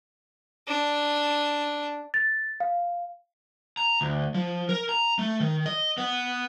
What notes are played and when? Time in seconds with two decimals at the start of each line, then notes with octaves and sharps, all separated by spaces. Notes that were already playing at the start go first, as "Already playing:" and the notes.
0.67 D4
2.14 A6
2.60 F5
3.77 A#5
4.01 D2
4.34 F3
4.69 A#4
4.89 A#5
5.19 A3
5.40 D#3
5.66 D#5
5.98 B3